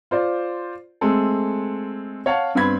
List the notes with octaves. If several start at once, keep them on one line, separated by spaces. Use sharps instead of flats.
F4 C5 D5
G#3 A3 C4 G#4 A4
C#5 F5 F#5 A5
G2 B3 C4 B5 G#6